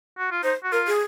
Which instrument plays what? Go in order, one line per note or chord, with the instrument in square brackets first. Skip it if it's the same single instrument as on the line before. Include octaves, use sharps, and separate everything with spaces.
[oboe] F#4
F4
[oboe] D#4 [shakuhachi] C5
[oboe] F#4
[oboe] F4 [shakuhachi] A#4
[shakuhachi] G#4